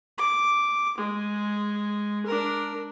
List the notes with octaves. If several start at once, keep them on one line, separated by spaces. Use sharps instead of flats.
D6
G#3
D4 A#4